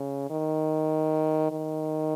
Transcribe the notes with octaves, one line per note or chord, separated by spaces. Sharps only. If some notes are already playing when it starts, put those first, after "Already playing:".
Already playing: C#3
D#3
D#3